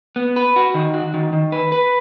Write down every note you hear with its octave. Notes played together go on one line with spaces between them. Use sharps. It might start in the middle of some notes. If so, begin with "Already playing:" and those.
B3
B4
F#4
D#3
F#4
D#3
D#3
B4
B4